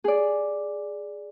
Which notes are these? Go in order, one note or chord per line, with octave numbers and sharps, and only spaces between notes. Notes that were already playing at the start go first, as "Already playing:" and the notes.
G#4 D5